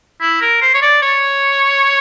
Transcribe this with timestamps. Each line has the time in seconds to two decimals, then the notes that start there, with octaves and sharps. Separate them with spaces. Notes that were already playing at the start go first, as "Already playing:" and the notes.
0.21 E4
0.41 A#4
0.62 C5
0.74 C#5
0.82 D5
1.02 C#5